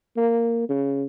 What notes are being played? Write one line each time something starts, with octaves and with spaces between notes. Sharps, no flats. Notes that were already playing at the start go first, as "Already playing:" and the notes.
A#3
C#3